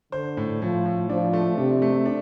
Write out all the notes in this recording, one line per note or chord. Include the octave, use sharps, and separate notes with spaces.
D3 C5
A2
A2 F3
A2
F3 D4
A3
C3 D4
A3
D4